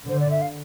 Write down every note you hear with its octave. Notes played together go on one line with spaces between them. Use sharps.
D3 C5
D5
E5
F5